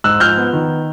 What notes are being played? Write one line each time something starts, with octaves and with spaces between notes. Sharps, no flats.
G#2 E6 F#6
F3 F6 G6
B3
D#3